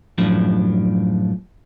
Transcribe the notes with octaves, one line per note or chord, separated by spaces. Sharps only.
F#2 A2 F3 D4